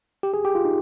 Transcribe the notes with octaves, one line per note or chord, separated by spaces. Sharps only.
G4
G#4
G4
F4
D#4